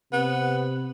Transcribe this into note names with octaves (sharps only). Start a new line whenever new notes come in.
C3 B3